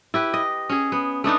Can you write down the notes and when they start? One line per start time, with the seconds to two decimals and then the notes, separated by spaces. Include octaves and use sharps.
0.14 E4 G4 B4
0.34 D#5
0.70 C#4 G#4
0.92 B3
1.24 A3 B3 D4 D#4